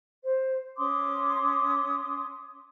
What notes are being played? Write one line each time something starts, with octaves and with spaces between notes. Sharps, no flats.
C5
C#4 C6 D6 D#6